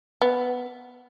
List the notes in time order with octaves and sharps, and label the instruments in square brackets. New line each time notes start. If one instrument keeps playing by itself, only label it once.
[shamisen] B3